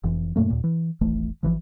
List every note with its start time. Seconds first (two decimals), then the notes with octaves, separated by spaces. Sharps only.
0.04 F1 F2 E3
0.36 F#2 A#2 A3 A#3
0.50 D#2 A#2
0.64 E3
1.01 D#1 G#1 E3 A3
1.43 G#1 D#2 E3 F3